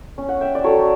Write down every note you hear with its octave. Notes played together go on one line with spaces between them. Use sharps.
C#4
F#5
E5 G5
D5
F#3 A4 C#5